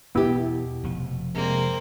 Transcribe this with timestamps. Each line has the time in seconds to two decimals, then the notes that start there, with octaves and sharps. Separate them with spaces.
0.15 E2 B2 B3 E4 G4
0.84 F1 F3
1.35 C3 G#3 A#3 C4 D4